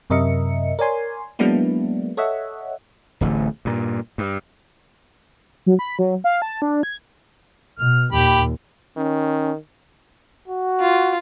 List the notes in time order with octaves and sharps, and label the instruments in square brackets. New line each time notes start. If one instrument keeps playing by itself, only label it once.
[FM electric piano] F#2 C3 A#4 D#5 E5 C#7
A#4 C#5 D5 G#5 C6
F#3 G#3 A#3 B3 D4 E4
A4 C#5 D#5 E5 F#5
[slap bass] D1 A1 D3 A3
G2 A#2
G2
[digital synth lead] F#3
B5
F#3
F5
A5
D4
G#6
[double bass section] B2 [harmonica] F6
[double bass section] D#2 A#2 [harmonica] G4 B5
[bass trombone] D#3 [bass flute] C#4
[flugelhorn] F#4
[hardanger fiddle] F4